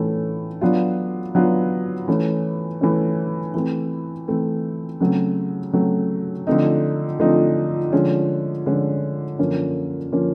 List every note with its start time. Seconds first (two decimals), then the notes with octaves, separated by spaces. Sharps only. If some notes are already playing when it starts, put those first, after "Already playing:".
Already playing: A2 E3 A3 C#4
0.61 F#3 B3 D4 F4
1.35 F#3 B3 D4 F4
2.08 E3 A3 C#4
2.81 E3 A3 C#4
3.54 E3 A3 C4
4.28 E3 A3 C4
5.00 C#3 F#3 A3 C4
5.73 C#3 F#3 A3 C4
6.47 D3 F3 A3 C4 D#4
7.20 D3 F3 A3 C4 D#4
7.93 D3 F3 G#3 C#4
8.66 D3 F3 G#3 C#4
9.39 F#2 D3 F3 A#3 C#4
10.12 D3 F3 A#3 C#4